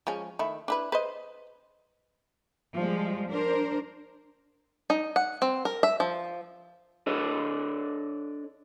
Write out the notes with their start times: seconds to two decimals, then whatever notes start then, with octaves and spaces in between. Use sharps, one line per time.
0.07 F3 G#3 C#4
0.39 D#3 A3 E4
0.68 D4 E4 B4
0.92 B4 C5 D#5
2.74 F3 G3 G#3
3.28 D4 A#4 C5
4.90 D#4
5.16 F#5
5.42 C4
5.65 A#4
5.83 E5
6.00 F3
7.07 D4 A4 C#5 D#5